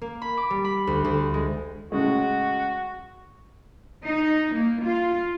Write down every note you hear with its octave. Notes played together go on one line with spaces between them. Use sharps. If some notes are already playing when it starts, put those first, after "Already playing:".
A#3
B5
D6
G3
B5
D2
D2
G#3
A2 C#3 G#3 F#4
D#4
A#3
F4